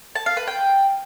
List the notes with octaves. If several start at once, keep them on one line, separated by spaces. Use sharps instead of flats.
A5
F5
B4
G5